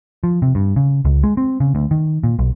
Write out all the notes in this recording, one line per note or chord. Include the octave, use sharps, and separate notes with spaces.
F3
C3
G2
C#3
C#2
G#3
C4
C#3
D2
D#3
A#2
B1